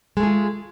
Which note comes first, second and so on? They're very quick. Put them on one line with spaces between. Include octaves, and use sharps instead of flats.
G#3 A3 G#4 F4